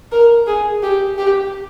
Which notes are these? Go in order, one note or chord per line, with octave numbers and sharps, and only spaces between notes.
A#4
G#4
G4
G4